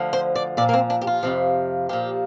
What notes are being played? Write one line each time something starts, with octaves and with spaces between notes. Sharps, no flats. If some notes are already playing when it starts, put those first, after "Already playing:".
Already playing: D2 D3 F3
C5
D5
A#2 F3 D5
A#3
C4
D4
G4
F4
F2 C3 F3
A#2 F3 G4